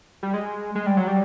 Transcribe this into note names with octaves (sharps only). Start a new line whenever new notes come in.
G3
G#3
G#3
G3
F#3
G3